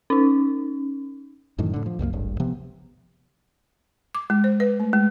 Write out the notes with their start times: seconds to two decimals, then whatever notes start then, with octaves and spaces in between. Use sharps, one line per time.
0.10 C#4 D#4
1.59 F#2 A2 D#3 E3
1.74 A2 D3
1.86 F3
1.99 C2 F#2 G3 A#3
2.13 D1 G#1 G2
2.40 C3 F3 B3
4.15 D6
4.30 G#3
4.44 C5
4.60 B4
4.80 A3
4.93 G#3